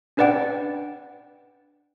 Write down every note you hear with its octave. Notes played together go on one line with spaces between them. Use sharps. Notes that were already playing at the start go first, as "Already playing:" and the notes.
C#4 D4 B4 D5 F#5 G5